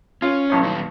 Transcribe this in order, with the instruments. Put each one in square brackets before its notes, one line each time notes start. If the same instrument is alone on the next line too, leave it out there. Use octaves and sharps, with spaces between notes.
[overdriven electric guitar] C#4 [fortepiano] F4
[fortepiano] B1 A2 C#5
[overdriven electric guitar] A#2 D#3